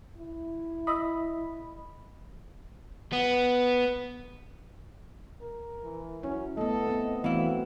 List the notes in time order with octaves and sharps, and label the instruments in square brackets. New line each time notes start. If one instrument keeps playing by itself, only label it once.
[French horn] E4
[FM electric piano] D#5 B5 [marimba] D#6 E6
[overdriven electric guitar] B3
[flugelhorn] A#4
[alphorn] E3
[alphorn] F#3 [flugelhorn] C#4 [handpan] E4
[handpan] A3 B3 [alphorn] A4 [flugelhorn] D#5
[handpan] B3 C4
[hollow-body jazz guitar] E3 E4 [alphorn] F#3 [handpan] A3 B3 C4 [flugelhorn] F5